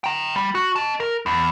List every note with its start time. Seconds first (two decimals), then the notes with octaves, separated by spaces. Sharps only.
0.04 G5 A#5
0.36 G3
0.55 F#4
0.75 D#5 A5
1.00 A#4
1.26 E2